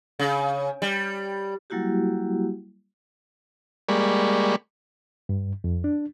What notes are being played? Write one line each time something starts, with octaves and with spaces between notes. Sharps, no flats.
C#3
G3
F#3 G3 A#3 E4 F#4 G4
G3 G#3 A#3 D5 B5 C#6
G2
F2
D4